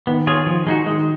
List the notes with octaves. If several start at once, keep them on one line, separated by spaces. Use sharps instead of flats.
D#3 B3
F4 G#4 C#5
F3
G#3 D#4 F#4
D#3 G#3